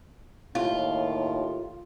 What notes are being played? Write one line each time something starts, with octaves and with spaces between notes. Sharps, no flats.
D#2 A2 F4